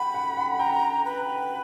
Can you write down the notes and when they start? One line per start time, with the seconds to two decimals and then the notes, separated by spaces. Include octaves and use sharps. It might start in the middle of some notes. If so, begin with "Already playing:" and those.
Already playing: F#5 G5 B5
0.14 F#5
0.37 F#5
0.59 G5 A#5
1.05 B4